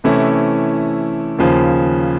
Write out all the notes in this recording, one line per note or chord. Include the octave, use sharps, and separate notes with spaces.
C3 E3 A3 C#4 E4
D#2 C#3 F3